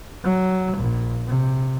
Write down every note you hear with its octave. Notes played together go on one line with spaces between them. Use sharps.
F#3
A#1
C3